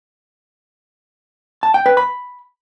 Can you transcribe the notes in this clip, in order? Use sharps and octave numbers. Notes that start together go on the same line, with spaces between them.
A5
G5
B4
B5